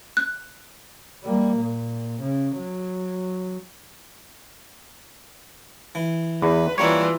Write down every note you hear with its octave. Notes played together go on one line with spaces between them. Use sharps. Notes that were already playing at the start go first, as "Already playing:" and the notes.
F#6
G3 A#3
A#2
C#3
F#3
E3
E2 B4
E3 G3 A#3 D4 F4 C#5